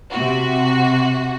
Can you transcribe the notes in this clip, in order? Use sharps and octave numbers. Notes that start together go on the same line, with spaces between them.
C3 F#4